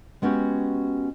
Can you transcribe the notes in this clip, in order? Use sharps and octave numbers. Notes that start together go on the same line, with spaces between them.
G#3 B3 C#4 F#4 G4